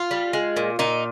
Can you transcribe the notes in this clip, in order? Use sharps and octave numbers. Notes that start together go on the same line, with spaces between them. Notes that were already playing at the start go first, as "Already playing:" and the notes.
Already playing: F4
G3
G#3
A#2
A#2 D#4